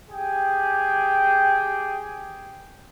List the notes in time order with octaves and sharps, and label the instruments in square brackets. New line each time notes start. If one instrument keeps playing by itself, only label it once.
[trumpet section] G4 G#4 G5